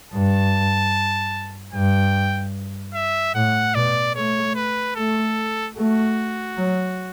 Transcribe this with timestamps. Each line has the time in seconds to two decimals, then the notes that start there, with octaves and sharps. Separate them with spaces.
0.12 G2 A5
1.73 G2 G5
2.94 E5
3.34 A2 F#5
3.75 B2 D5
4.15 A3 C#5
4.55 B4
4.96 A3 A4
5.76 A3 F#4
6.57 F#3